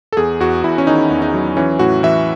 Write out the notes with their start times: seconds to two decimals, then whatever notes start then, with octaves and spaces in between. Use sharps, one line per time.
0.13 A4
0.17 E2 G#4
0.40 E2 F#4
0.64 E2 E4
0.78 C#4
0.87 D#3 D#4
1.11 E2
1.22 D#4
1.34 F#3
1.57 E3 C#4
1.79 A2 F#4
2.03 E3 E5